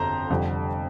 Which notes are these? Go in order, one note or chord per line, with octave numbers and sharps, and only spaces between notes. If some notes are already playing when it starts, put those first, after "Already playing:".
Already playing: G1 F2 D3 C5 A#5
F1 F2 D3 G3